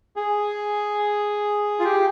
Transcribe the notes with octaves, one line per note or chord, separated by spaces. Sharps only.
G#4
F4
G4